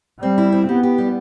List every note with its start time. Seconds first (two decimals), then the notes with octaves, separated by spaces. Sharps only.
0.22 G3 C4
0.38 E4
0.52 C4
0.68 B3 G4
0.83 G4
0.98 G3